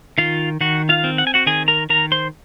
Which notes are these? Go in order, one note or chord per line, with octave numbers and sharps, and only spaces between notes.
D#3 F4 F5
D#3 F#4 F#5
F4 F5
C4
F#5
G#5
F#4 F#5
D#3 G#4 G#5
A#4 A#5
D#3 A#4 A#5
C5 C6